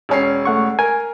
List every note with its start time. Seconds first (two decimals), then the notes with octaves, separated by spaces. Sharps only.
0.09 E1 C#4 C7
0.45 A3 F#5 C#6
0.79 A#4 G#5